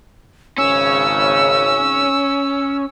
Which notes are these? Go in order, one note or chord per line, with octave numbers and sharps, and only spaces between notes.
G#1 C#3 C#4 E6